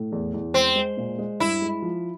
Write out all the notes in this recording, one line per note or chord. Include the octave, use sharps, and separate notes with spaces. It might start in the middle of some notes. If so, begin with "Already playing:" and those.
Already playing: A2
E2
E2
G#3 C4
G#3
A#2
G#3
G2 E4
G#3
F3